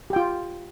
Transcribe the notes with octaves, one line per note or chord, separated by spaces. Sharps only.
F4 G4 G5